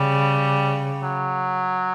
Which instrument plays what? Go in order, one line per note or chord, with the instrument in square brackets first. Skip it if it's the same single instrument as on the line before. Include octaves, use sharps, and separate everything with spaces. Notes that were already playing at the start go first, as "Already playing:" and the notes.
Already playing: [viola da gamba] C#3 [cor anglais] G3
[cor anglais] F#3